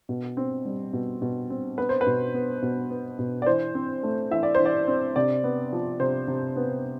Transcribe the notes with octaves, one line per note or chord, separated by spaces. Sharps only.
B2
C4
G3
B2
B2
C4
B3 B4
C5
B4
B2
B3
B2
B3
B2
D5
E3 C5
C4
A3
E3 E5
D5
C5
E3
D5
C4
C3 D5
B3
F3
C3 C5
C3
B3